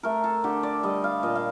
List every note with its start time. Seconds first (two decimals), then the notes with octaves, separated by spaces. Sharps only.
0.03 A3 A#4
0.24 A4
0.44 D3 G4
0.63 D5
0.83 G3 D#5
1.04 F5
1.23 A#2 D#5
1.35 F5